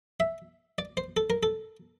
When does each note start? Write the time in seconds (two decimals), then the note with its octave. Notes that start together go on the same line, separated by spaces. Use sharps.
0.20 E5
0.78 D5
0.97 C5
1.17 A4
1.30 A#4
1.43 A4